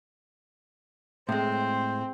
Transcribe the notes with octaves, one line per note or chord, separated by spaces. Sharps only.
A2 G#3 C4 C5